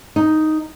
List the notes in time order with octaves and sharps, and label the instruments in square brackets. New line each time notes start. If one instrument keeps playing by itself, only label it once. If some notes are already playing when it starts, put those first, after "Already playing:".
[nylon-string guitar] D#4